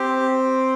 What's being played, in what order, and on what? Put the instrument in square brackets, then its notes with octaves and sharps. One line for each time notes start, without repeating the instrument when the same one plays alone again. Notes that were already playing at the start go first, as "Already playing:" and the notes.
Already playing: [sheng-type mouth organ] C4 G4